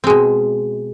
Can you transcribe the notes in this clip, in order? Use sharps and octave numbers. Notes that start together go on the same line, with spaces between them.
B2 G#3 C4